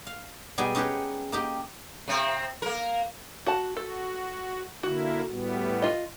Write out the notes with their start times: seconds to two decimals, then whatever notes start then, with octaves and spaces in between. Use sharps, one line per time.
0.07 F5
0.58 B2 G3 D#4 G#4 G#5
0.75 C#4 D#4 G4 G#4 B4 C#5
1.32 A#3 D#4 G4
2.08 C3 C4
2.62 A#3 A#4
3.46 F#4 F#5 A5
3.77 F#4 A4
4.83 D3 A#3 E4 F#4
5.29 A2 G3 B3
5.82 F4 D#5